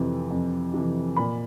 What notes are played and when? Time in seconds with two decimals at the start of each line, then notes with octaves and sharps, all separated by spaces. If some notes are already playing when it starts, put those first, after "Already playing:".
Already playing: F2 C3 E3
0.30 F2
0.74 C3 E3
1.16 A#2 B5